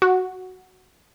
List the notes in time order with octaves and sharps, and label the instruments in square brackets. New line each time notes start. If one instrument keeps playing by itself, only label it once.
[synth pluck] F#4